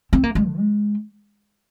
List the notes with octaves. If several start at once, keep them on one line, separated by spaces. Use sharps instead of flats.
C4
A#3
G#3
D3
G#3